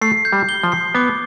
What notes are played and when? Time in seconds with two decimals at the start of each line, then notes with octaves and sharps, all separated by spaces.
0.01 A3 C7
0.25 G6
0.33 G3
0.49 G7
0.63 F3
0.72 C7
0.95 B3 D6